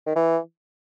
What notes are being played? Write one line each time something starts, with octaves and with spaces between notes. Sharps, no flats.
D#3
E3